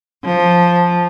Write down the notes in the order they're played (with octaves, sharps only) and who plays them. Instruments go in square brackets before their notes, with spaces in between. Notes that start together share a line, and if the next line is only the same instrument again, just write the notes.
[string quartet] F3